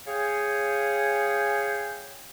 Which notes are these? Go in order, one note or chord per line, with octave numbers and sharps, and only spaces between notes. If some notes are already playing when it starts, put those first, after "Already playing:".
G#4 C#5 F5 G5 G#5